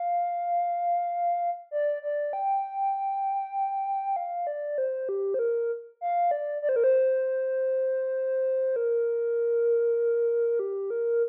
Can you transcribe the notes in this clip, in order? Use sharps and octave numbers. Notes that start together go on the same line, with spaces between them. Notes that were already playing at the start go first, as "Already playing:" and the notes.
Already playing: F5
D5
D5
G5
F5
D5
C5
G4
C5
A#4
F5
D5
D5
C5
A#4
C5
A#4
G4
A#4